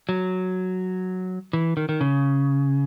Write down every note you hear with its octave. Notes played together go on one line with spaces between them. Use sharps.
F#3
E3
D#3
D#3
C#3